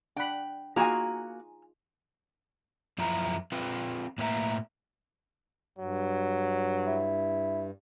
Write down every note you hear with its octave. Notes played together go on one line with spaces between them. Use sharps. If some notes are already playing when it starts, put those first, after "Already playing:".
D4 F#5 G5 B5
A#3 D#4 F4 F#4 G#4 G#5 A#5
F#2 F3 E4 A#5
C4 F4 B4
A2 A#3 B4 E5 A#5
G2 F#3
E4